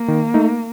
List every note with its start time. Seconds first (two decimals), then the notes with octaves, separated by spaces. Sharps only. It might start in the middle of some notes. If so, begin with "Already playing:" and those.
Already playing: A#3
0.08 D#3
0.34 A3 D#4